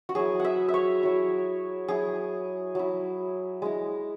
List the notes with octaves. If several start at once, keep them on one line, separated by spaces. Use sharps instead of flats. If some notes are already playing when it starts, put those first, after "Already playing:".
F#4
F#3 E4 G#4
E5 F#5
E5
C#5
F#3 E4
F#3 E4 G#4
F#3 E4
G#3 E4